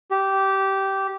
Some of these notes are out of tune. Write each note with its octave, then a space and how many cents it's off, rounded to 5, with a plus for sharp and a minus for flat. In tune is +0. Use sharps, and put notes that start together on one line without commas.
G4 -15